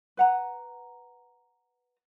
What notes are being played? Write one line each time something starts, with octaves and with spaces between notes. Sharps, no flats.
B4 F#5 A#5